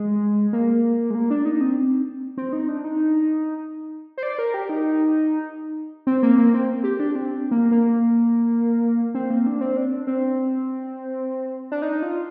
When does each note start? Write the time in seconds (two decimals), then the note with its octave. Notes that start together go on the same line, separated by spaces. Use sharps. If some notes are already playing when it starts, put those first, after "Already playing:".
Already playing: G#3
0.53 A#3
1.10 G#3
1.15 A#3
1.30 D4
1.45 D#4
1.61 C4
2.37 C4
2.53 D#4
2.68 D4
2.84 D#4
4.18 C5
4.23 D5
4.39 A#4
4.54 G4
4.69 D#4
6.07 C4
6.23 A#3
6.38 A#3
6.54 C4
6.84 G4
7.00 D4
7.16 C4
7.51 A#3
7.72 A#3
9.15 C4
9.30 A#3
9.47 D4
9.61 C4
9.77 D4
10.07 C4
11.72 D4
11.82 D#4
12.02 F4